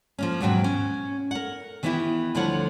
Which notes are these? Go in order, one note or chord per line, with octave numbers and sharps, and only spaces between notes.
F3 A#3 C#4
D#2 G#2 B2 F#3 F#4 G5
C#4
A#4 F#5
D#3 E3 B3 D4 E4 G4
D2 D3 F3 G3 C#5 F#5